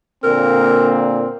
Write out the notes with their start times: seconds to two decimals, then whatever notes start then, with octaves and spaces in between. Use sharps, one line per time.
0.24 A#2 D3 A#3 C4 A#4